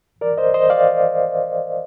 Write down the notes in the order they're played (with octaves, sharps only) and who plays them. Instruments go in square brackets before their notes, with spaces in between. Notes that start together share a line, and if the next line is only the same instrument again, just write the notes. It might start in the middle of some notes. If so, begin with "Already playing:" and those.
[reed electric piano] A#4 D5
C5 D#5
C5 D#5
D5 F5